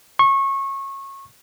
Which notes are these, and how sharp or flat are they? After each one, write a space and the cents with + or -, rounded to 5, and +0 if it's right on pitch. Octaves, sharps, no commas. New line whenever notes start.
C#6 -25